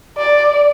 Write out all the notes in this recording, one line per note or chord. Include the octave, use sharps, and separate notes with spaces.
D5